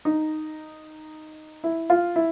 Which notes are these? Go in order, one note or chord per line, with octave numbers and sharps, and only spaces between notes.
D#4
E4
F4
E4